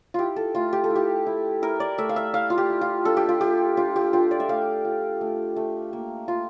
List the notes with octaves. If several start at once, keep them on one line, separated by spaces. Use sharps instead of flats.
E4 F4 G4
A4
A3 F4
G4
A4
E4
G4
E4
E4 A#4
D5
A3 E5
F5
E5
E4 F5
F4
G4
E4
F4
D4 A4
G4
F4
A3 G4
D4 F4
G4
D4 F4
D5
E5
A3 F5
F4
A3
A3
A#3
F4